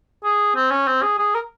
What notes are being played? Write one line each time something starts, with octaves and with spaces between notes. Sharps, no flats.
G#4
C4
C#4
C4
G#4
G#4
A#4